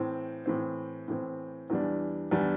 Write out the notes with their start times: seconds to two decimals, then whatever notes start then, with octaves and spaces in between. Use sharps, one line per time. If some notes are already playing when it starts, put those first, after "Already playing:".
Already playing: A2 E3 C4
0.46 A2 E3 C4
1.08 A2 E3 C4
1.70 E2 E3 G3 D4
2.31 E2 E3 G3 D4